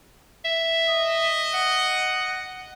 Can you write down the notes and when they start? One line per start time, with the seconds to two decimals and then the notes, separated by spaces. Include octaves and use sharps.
0.45 E5
0.90 D#5
1.54 F#5